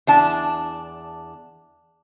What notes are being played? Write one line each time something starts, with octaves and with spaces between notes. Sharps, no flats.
E2 D4 A5